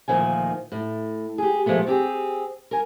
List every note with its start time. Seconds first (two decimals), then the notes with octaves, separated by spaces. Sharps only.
0.08 D2 A#2 D#3 F3 G#5
0.72 A2
1.38 G4 G#4
1.66 A#2 F3 G#3 A3 B3
1.87 C4 G4 G#4
2.71 A#4 G#5